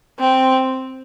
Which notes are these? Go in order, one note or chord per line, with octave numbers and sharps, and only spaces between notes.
C4